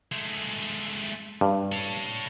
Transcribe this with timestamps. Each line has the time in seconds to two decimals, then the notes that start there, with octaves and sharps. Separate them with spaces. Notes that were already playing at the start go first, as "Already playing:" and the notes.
0.12 G#3 A3
1.41 G2
1.72 A4 C#5